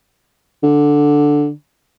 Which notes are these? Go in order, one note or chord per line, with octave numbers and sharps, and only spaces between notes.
D3